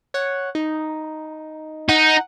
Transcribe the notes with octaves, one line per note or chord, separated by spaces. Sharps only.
C#5 F#5
D#4
D#4 F#5